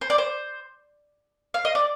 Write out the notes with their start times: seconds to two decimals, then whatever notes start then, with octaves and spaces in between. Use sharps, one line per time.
0.01 C5
0.10 D5
0.18 C5
1.54 F5
1.65 D#5
1.75 D5